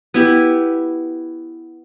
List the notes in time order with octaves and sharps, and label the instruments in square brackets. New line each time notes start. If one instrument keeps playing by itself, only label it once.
[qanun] B3 E4 G4